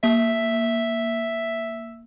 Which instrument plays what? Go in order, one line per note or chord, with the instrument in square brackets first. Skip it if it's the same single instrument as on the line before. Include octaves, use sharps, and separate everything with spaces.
[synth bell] A#3 [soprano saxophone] E5